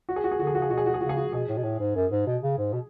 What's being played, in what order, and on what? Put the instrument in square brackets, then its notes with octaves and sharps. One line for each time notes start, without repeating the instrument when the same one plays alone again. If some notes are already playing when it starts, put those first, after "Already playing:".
[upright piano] F#4
G#4
F#4
G#4
[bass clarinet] D3 [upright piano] F#4
[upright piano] G#4
F#4
[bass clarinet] C#3 [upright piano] G#4
[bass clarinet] B2 [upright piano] F#4
[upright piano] G#4
F#4
G#4
[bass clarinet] C#3 [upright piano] F#4
[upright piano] G#4
F#4
[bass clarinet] B2 [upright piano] G#4
[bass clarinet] A2
B2
A2
G#2
F#2
G#2
B2
C#3
G#2
B2